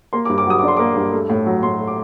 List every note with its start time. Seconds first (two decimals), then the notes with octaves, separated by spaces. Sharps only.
0.13 A#3 C6
0.25 D6
0.29 G2
0.38 D6
0.46 F#3 D#6
0.59 D6
0.63 D4
0.68 C6
0.77 A#3 D6
0.97 G2
1.13 A3
1.30 A2
1.46 F#3
1.63 A2 C6
1.79 A3
1.88 D6